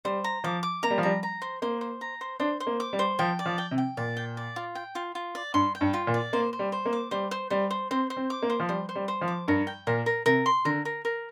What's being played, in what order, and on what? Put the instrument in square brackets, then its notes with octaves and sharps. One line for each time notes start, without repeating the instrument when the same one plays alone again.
[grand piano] G3 [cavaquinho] C5
[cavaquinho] A#5
[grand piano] F3 [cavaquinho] D6
[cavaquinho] D6
[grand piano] A#3 [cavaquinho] A#5
[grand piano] G3
F3
[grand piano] G3 [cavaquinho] A#5
[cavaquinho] A#5
C5
[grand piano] A#3 [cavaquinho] C5
[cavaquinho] C5
A#5
C5
[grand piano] D4 [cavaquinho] C5
[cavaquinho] C5
[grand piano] A#3
[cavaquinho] D6
[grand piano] G3
[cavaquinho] C5
[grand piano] F3 [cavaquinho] G5
[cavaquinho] D5
[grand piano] F3
[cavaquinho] G5
[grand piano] C3
[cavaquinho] G5
[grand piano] A#2 [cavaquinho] D5
[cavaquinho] G5
D5
F4
G5
F4
F4
D5
[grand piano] G2 [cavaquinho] C6
[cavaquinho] G5
[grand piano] G2
[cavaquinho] F4
[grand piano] A#2
[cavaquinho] D5
[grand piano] A#3 [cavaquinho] C5
[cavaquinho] C5
[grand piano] G3
[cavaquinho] C5
[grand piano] A#3
[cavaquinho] D6
[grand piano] G3 [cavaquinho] C5
[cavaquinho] C5
[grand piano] G3 [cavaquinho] C5
[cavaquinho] C5
[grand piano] C4 [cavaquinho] C5
[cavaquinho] C5
[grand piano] C4
[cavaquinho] D6
[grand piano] A#3
[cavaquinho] C5
[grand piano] F3
[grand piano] G3 [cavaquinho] C5
[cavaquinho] C5
[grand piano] G3
[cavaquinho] C5
[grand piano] F3
[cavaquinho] D6
[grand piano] G2 [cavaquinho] A#4
[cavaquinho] G5
[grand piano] A#2 [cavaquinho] A#4
[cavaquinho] A#4
[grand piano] C3 [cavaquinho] A#4
[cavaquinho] C6
[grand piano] D3 [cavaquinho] A#4
[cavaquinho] A#4
A#4